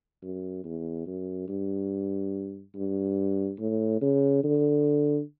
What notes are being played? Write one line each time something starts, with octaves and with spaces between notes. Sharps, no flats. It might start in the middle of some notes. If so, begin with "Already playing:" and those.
F#2
E2
F#2
G2
G2
A2
C#3
D3